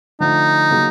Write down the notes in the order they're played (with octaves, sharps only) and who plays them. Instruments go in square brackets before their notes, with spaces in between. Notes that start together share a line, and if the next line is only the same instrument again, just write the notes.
[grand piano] D3 F3 A3 [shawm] D#4
[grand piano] C#3 F#3 A#3